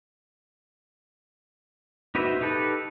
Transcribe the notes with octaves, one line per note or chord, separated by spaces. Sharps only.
D#4 F#4 B4 C5 E5
D#4 G4 A4 B4